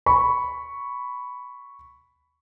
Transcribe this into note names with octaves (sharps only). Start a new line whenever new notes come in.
B5 C#6